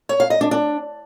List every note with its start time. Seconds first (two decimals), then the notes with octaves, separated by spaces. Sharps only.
0.09 C#5
0.20 F5
0.30 D#5
0.41 D4
0.51 D4